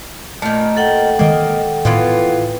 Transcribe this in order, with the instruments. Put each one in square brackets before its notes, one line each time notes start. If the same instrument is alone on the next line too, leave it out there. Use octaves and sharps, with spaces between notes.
[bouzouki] A#2 D#3 [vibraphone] A3
[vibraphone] A4 F#5 G5
[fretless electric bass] D#3 G#3 [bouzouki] A#3 D#5
[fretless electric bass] A2 [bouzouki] E3 B3 F4